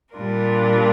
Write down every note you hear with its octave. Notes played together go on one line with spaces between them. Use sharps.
A#2 G3 D4 F4 A#4